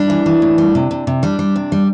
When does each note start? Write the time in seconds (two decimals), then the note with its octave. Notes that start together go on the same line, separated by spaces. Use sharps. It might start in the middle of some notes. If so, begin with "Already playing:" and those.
Already playing: G3 D4
0.10 E3
0.26 E3
0.42 A2
0.58 G3
0.75 C3
0.91 C3
1.07 C3
1.23 G3 D4
1.39 G3
1.56 C3
1.72 G3